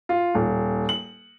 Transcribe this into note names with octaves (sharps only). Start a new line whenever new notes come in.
F4
D#1
F#7